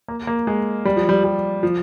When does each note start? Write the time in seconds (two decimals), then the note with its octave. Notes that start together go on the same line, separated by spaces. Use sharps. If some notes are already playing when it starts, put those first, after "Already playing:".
0.08 A#3
0.27 A#3
0.47 G#3
0.85 G3
0.96 F3
1.09 G3
1.24 G3
1.63 F3